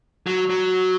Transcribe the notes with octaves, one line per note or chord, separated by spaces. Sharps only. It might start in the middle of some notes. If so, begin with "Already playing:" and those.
F#3
F#3